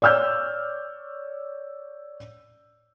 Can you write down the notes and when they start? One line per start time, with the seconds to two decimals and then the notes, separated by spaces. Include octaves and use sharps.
0.02 C#5 D5 E6 F6 G6